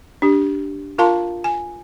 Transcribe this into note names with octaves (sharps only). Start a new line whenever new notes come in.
D4 G4
F4 A#4 F5 A5 A#5 C6
G#5